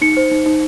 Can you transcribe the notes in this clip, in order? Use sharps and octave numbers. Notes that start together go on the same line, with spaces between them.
D#4 C#7
C5
D#4
D#4